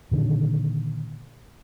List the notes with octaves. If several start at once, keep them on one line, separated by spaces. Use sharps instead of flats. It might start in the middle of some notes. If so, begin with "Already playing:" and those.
A#2 D3 D#3